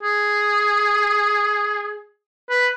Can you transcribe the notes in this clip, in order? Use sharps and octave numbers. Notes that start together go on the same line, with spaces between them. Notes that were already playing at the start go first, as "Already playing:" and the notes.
G#4
B4